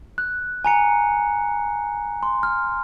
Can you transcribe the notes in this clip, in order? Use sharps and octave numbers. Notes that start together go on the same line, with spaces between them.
F#6
G#5 A#5 C#7
C6
F6